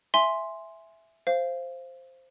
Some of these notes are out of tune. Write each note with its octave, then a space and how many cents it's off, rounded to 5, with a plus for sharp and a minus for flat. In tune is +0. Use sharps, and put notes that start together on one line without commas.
E5 +0 G#5 +0 C6 +0
C5 +0 F5 -20